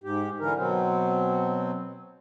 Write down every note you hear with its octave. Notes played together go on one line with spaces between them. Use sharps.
G#2 G4
D3 E3 A#4
B2 F#3 C4